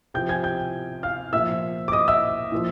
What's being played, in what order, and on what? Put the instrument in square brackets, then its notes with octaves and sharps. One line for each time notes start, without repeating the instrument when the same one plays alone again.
[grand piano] C3 F3 G5 G6
G#5 G#6
G5 G6
F5 F6
A#2 F3 E5 E6
D6
D#5 D#6
E5 E6
A#2 F3